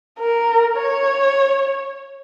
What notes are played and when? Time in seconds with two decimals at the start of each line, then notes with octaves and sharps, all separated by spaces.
0.19 A#4
0.77 C#5